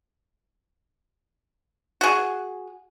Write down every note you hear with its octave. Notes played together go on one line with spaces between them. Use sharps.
F#4 G#4